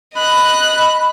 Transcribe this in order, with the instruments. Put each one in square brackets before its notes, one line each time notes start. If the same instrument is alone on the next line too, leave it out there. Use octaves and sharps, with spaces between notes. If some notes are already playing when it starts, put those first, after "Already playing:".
[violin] D#5 F#6 [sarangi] B5